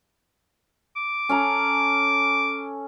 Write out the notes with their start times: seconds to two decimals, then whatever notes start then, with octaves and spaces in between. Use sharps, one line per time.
0.96 D6
1.29 C#4 A4 A#5